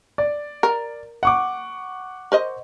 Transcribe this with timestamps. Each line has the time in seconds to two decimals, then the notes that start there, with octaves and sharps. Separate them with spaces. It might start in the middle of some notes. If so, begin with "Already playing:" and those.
0.18 D5
0.63 A#4
1.23 F#5 C#6 D6
2.32 A#4 C5 D#5